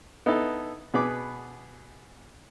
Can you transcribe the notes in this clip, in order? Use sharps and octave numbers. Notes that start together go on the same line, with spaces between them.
B3 D#4 E4 A4 A5
B2 B3 G#4 B4 B5 D6